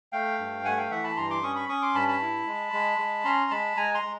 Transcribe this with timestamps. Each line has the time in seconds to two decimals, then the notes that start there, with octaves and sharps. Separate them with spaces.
0.12 A3 F5 G5
0.39 G2
0.65 A3 F#5 G#5
0.78 F5 G5
0.91 E3 E5 F#5
1.04 A5 B5
1.17 G2 A#5 C6
1.30 C6 D6
1.43 C#4 C#6 D#6
1.55 B5 C#6
1.69 C#4 C#6 D#6
1.82 C6 D6
1.94 G2 A5 B5
2.08 A5 B5
2.21 E4
2.47 G#3
2.73 G#3
2.98 G#3
3.24 C#4 A#5 C6
3.51 G#3 A5 B5
3.77 G#3 G#5 A#5
3.94 A#5 C6
4.03 G#3